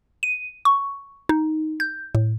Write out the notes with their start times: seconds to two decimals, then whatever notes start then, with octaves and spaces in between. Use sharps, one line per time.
0.23 D#7
0.65 C#6
1.29 D#4
1.80 G6
2.15 A2